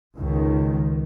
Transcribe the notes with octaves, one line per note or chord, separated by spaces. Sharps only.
C#2 D#3